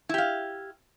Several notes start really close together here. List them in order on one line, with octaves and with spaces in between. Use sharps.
E4 G4 F5